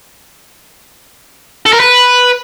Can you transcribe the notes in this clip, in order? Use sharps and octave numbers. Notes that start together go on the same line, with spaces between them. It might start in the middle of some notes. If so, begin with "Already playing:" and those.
A4
A#4
B4